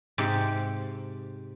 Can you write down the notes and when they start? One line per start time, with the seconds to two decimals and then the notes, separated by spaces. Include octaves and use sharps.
0.18 G#2 C3 G4